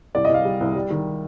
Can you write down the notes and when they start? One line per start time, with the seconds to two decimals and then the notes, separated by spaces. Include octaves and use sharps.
0.15 C2 D5
0.25 D#5
0.29 C2
0.34 F5
0.45 G3
0.61 C2
0.75 G3
0.90 D#3